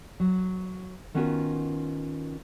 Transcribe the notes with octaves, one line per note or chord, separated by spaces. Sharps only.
F#3
D#3 B3 C#4 F4 F#4 A#4